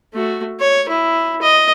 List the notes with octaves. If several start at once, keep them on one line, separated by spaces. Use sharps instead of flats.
A3 F#4
C#5
E4
D#5